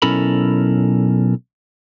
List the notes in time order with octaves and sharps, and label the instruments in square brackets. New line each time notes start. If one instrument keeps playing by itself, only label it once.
[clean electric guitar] B1 C#4 E4 A4 A#4 B5